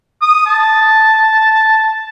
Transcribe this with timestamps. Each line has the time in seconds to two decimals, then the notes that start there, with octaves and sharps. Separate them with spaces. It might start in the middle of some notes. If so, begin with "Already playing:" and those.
0.21 D#6
0.46 A5